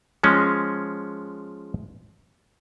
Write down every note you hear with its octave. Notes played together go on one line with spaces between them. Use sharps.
F3 G#3 C#4